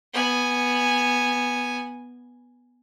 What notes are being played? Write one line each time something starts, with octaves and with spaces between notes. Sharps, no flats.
B3 G#5